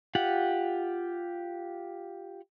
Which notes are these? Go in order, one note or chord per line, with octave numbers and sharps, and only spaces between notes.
F4 G4 F#5